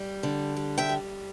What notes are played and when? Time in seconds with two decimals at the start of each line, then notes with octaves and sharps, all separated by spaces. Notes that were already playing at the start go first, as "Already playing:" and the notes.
Already playing: G3
0.23 D3
0.57 G3
0.78 E5 G5
0.89 G3